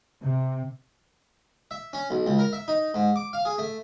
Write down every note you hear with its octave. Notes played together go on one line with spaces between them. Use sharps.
C3
E5
C#4
B1
C#2
A#4
E5
D#4
G#2
D6
F5
G#4
A3